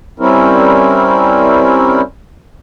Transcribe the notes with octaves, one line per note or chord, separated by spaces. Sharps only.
G3 C4 C#4 E4 A#4